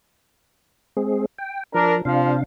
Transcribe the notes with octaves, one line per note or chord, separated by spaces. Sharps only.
G#3 C4 G#4
G5
F3 D4 A#4
C3 F3 D4 F5